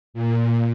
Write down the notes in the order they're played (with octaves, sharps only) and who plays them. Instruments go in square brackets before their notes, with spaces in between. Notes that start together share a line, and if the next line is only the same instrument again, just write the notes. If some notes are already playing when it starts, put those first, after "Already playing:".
[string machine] A#2